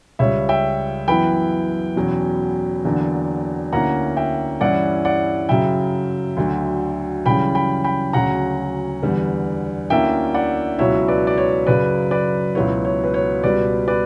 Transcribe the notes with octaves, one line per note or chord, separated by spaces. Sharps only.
C#2 C#3 G3 C#5 E5
E5 G5
F#2 E3 B3 E4 G5 B5
E2 B2 F#3 C#4
E2 D3 F#3 A#3 D4
D2 D3 A#3 C#4 E4 F#5 A#5
E5 G5
G2 E3 G3 C#4 E4 D5 F#5
D5 F#5
F#2 C#3 F#3 E5 G5
D2 D3 F#3
F#2 C#3 E3 G3 C#4 G5 B5
G5 B5
G5 B5
D2 C#3 F#3 C#4 F#5 A#5
E2 D3 G3 B3
D2 D3 A#3 C#4 E4 E5 G5
D5 F#5
C#2 B2 F#3 C#4 E4 C#5 E5
B4 D5
D5
C#5
F#2 C#3 F#3 B4 D5
B4 D5
C#2 B2 F#3 B3 E4 C#5
C#5
B4
C#5
C#2 B2 G3 B4 D5
B4 D5